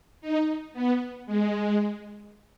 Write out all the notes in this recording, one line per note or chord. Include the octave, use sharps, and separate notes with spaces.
D#4
B3
G#3